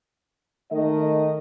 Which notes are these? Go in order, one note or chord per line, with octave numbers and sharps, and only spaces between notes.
D#3 A3 D#5